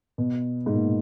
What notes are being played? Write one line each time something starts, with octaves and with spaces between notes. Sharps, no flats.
B2
G#2
A#2